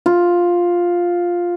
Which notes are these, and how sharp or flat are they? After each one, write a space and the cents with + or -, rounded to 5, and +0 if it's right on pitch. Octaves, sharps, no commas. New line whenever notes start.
F4 +5